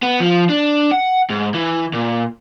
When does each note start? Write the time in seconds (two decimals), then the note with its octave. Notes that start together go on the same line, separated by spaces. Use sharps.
0.03 B3
0.20 F3
0.50 D4
0.91 F#5
1.30 G#2
1.54 E3
1.93 A#2